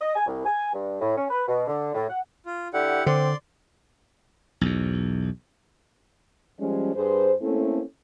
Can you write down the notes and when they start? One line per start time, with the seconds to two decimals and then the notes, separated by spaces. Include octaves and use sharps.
0.01 D#5
0.15 G#5
0.27 C2
0.45 G#5
0.73 G2
1.01 A2
1.16 C#4
1.30 B4
1.47 B2
1.67 D3
1.94 A2
2.09 F#5
2.46 F4
2.74 D3 E4 G4 F#5
3.06 D3 C4 D5 C6
4.61 B1 E2
6.60 F3 G3 G#3 C#4
6.96 G2 G#4 B4 C5
7.41 A3 A#3 C4 C#4 E4 A4